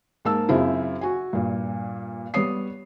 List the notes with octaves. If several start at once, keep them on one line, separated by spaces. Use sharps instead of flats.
G#2 A#3 A5 E6
F#2 C#3 C4 E4 F4
F#4 G#5
G2 A#2
G3 B3 C#5 D#6 C7